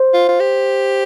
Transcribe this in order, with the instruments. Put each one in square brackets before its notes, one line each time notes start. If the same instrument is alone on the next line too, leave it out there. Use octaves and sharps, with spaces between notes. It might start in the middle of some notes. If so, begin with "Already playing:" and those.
Already playing: [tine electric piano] C5
[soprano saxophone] F4
F4
G4